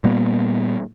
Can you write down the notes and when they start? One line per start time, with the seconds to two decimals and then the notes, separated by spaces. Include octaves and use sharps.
0.04 A#2 G3 A#3 B3